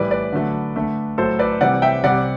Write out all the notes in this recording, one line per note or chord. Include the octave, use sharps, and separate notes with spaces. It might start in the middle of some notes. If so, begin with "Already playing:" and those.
Already playing: A2 E3 G3 B4 D5
B4 D5
D3 F#3 A3
D3 A3
A2 F#3 A3 A4 C5
B4 D5
C3 E3 G3 D5 F#5
E5 G5
C3 G3 D5 F#5